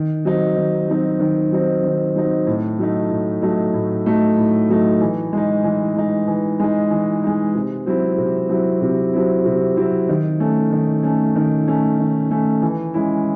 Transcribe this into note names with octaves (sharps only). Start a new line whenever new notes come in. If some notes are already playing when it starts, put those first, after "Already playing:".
Already playing: D#3
F#3 C4 D#4
D#3
F#3 C4 D#4
D#3
F#3 C4 D#4
D#3
F#3 C4 D#4
A2
F#3 A3 D#4
A2
F#3 A3 D#4
A2
F#3 A3 D#4
A2
F#3 A3 D#4
E3
G#3 D#4
E3
G#3 D#4
E3
G#3 D#4
E3
G#3 D#4
C3
F#3 C4 E4
C3
F#3 C4 E4
C3
F#3 C4 E4
C3
F#3 C4 E4
D#3
A3 C#4
D#3
A3 C#4
D#3
A3 C#4
D#3
A3 C#4
E3
G#3 C#4 E4